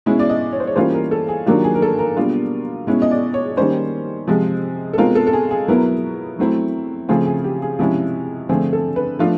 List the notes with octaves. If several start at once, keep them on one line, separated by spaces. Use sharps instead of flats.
B2 G#3 C#4 E4
D5
D#5
C#5
C5
C#5
E3 G3 A#3 C#4 F4 C5
A#4
A4
G#4
D#3 F#3 A#3 D4 F4 G4
G#4
A#4
A4
A#4
B2 G3 A#3 D4 F4
B2 G#3 C#4 E4
D#5
D5
C#5
D#3 G3 A#3 C#4 C5
C3 F3 G#3
A4
B2 G#3 C4 F4 A#4
A4
A4
G#4
G#4
B2 F#3 B3 E4 A#4
F#3 A3 C4 E4
C#3 F3 A3 C4 F4 G#4
G#4
G4
G#4
C3 F3 G#3 C#4 E4
D3 F3 A3 C4 G#4
A4
B4
F3 A3 D4 F4